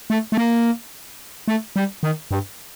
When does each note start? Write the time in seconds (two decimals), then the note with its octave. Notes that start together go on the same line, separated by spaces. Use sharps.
0.10 A3
0.32 A3
0.37 A#3
1.48 A3
1.76 G3
2.03 D#3
2.31 G2